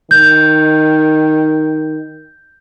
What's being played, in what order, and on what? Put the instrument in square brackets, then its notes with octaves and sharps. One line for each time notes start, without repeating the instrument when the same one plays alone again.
[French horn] D#3 [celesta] G6